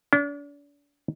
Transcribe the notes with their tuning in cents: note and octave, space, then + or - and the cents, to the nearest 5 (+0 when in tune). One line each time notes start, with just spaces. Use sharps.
D4 -40